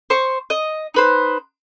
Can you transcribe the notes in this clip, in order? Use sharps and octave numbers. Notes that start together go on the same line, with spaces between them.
C5 C#6
D#5
D#4 B4 C5